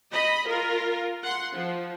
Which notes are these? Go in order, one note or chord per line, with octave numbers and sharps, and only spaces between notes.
D#5 B5
F4 A#4
F#5 C6
F3